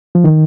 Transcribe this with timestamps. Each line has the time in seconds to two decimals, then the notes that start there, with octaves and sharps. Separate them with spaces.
0.15 F3
0.24 D#3